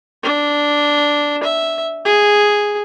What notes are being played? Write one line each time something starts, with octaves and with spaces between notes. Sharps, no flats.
D4
E5
G#4